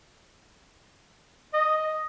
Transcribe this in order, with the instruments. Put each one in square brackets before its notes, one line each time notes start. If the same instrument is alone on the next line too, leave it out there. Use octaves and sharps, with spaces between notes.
[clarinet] D#5